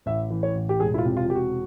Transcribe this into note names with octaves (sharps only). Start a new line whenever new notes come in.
A1 E5
E3
C#5
A1
G4
E1 G#4
E4
F4
C3
F4
E1 G4
F#4